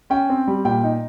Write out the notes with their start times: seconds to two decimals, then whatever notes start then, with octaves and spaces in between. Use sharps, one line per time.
0.10 C#4 G5
0.29 C4
0.48 G3
0.65 A#2 G5
0.83 D#4